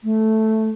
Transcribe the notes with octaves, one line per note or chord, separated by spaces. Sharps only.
A3